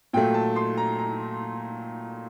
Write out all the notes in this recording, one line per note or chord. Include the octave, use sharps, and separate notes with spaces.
A#2 F#3 A3 G5
A5
C6
A#5
A#5